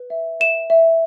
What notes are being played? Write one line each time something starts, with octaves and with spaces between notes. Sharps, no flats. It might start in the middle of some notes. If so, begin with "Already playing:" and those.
Already playing: B4
E5
E5 E7
E5